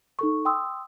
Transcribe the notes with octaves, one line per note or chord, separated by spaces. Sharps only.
D#4 A4 C#6
G5 C6 D#6 E6